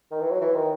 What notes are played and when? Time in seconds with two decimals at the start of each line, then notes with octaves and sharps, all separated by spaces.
0.11 D#3
0.20 E3
0.31 F#3
0.41 E3
0.54 D#3